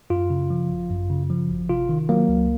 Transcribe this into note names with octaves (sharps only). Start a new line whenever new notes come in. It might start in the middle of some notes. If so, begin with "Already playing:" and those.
F#2 F4
C#3
F3
G#1
F#2
C#3
F3
G#1
C3 F4
D#3
F#3 A#3
C#2